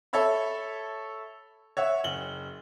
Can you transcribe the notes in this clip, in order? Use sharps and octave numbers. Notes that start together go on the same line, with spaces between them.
A4 C#5 E5 B5
C#5 E5 F#5
F#1 F#7 G7